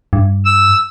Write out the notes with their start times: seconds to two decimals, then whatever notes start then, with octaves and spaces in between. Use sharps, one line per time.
0.13 G2
0.45 E6